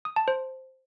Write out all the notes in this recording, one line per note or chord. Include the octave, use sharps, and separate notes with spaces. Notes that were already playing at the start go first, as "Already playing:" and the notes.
D#6
A5
C5